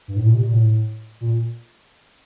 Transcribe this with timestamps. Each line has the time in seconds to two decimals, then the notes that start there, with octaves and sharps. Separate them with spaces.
0.08 G2
0.16 A2
0.25 A#2
0.35 C3
0.44 A#2
0.53 A2
1.21 A#2